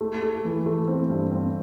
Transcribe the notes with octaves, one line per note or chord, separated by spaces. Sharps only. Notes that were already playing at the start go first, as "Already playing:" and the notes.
A3
A3
E3
A3
C4
G2
C4